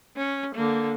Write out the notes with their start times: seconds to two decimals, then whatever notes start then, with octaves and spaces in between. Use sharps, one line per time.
0.16 C#4
0.55 D3 A#3